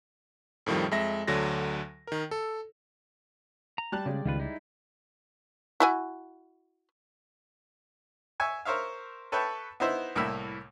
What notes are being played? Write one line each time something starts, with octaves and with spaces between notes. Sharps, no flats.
F2 A2 D#3 F3 G3
F2 G#3 E5 A#6
D2 D3 F#3 A#6
D#3 A#4
A4
A#5
G3 A5 F#6
C#3 G3 G#3 D5
C#2 D#3 F4 B4
D#4 E4
E4 F#4 G#5
E5 G#5 C#6
A#4 C5 C#5 E5 F5
A4 B4 C#5 E5 G5 A5
B3 D#4 E4 C5 E5
C2 A2 A#3 E4 B5 E6